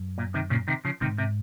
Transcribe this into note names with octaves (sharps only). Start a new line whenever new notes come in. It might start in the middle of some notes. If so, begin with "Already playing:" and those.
Already playing: F#2
A#2
C3 D#3
A#2 C#3
C3 D#3
C#3 F3
G#2 C3 D#3
C3